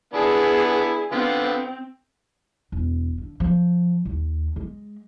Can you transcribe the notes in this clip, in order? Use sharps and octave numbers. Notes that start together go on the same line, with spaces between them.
B3 D4 E4 G#4
D3 B3 C4 F4
E1
D3
F3
D#2
G#3